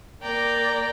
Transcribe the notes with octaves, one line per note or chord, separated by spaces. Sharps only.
A#3 D5 G5 A#5